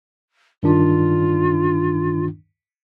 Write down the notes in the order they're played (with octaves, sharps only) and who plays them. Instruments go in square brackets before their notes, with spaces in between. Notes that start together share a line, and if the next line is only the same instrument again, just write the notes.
[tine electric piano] G2 D#3 D4 [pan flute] F4